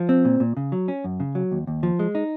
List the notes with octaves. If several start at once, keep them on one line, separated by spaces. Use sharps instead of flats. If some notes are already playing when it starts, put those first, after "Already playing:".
Already playing: F3
C4
A#2
A#2
C#3
F#3
C#4
F#2
C#3
F#3
D#2
D#2
F3
G#3
D#4